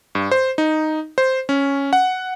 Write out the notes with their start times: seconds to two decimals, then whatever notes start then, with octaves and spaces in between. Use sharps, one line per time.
0.15 G2
0.31 C5
0.58 D#4
1.18 C5
1.49 C#4
1.93 F#5